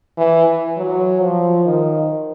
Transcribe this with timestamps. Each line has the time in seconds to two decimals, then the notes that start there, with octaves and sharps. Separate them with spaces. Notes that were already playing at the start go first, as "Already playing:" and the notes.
0.18 E3
0.77 F#3
1.21 F3
1.65 D#3